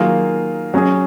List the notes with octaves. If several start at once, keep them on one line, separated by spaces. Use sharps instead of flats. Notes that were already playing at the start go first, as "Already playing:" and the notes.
Already playing: D#3 F#3 A#3 F4 G#4
F#3 C#4 G#4